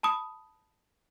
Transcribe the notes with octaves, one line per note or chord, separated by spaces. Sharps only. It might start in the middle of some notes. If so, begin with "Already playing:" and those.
A5 B5 D#6